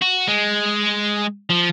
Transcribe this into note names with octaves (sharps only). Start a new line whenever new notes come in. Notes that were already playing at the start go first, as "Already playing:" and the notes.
F#4
G#3
F3